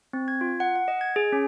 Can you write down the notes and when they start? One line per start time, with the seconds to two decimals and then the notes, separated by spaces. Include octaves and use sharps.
0.13 C4
0.28 G#6
0.41 F4
0.60 F#5
0.76 F#5
0.88 D#5
1.01 G#6
1.16 G#4
1.32 C#4